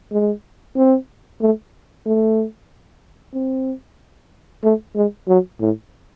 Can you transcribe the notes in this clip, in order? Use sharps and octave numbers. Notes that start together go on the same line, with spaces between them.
G#3
C4
A3
A3
C4
A3
G#3
F#3
A2